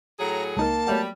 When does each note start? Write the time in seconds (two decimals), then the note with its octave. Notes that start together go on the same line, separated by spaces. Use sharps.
0.20 A2 F#3 G#4 A#5
0.57 C#2 A#3 D#4 A#4 A5
0.87 F#3 G3 A3 B3